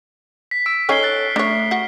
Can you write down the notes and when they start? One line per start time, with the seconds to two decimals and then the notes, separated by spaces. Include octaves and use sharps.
0.51 B6
0.66 E6 D7
0.89 C#4 D#4 A4 C#5 G#5 F6 C7 G7
1.03 F#6 A6
1.36 A3 D4 C#5
1.71 F#4